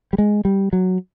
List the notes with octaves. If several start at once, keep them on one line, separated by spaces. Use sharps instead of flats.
G3
G#3
G3
F#3